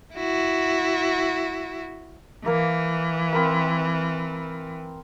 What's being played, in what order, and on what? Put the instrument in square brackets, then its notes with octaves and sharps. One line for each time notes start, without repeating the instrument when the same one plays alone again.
[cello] E4 F#4
[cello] E3 [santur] A#3 A#4
[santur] C4 A#4 B5